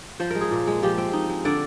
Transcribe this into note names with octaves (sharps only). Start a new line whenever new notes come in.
F3 C5
G#3 A#4
G#4
A#2
G#3
F3 G4
C4
D#4
G#3
D3 D5